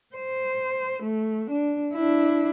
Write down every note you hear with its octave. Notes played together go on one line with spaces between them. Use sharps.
C5
A3
D4
D4 E4